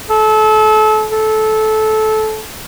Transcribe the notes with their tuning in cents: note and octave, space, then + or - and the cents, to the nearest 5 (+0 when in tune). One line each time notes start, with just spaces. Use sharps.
A4 -30
A4 -20